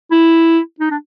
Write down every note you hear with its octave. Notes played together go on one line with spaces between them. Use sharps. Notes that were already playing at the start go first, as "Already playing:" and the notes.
E4
D#4
D4